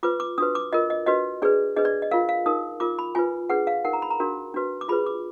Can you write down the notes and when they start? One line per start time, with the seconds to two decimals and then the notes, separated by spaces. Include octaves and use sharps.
0.03 F4 B4 D6
0.20 D6
0.38 D4 F#4 B4 D#6
0.55 D6
0.73 F4 A#4 D#5
0.90 D#5
1.06 D4 F#4 B4 D#5
1.42 D4 G#4 B4 D5
1.76 D4 G#4 B4 D#5
1.85 D5
2.02 D#5
2.11 F4 A#4 F5
2.29 F5
2.46 D#4 A#4 D#6
2.80 F4 A#4 D6
2.99 B5
3.15 F4 B4 G#5
3.50 D4 G#4 B4 F#5
3.67 F5
3.85 D#4 A#4 F#5
3.93 A#5
4.02 B5
4.10 A#5
4.20 D4 F#4 A#4
4.54 D4 F#4 B4
4.81 D6
4.88 F4 G#4 B4 B5
5.06 D6